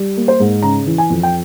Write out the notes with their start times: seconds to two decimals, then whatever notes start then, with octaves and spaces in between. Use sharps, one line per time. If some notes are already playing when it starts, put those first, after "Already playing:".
Already playing: G3
0.17 A#3
0.28 C5
0.40 G#2
0.62 C#3 A#5
0.86 E3
0.98 G#5
1.10 F2
1.23 G5